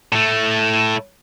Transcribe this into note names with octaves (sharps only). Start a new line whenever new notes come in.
A2 A3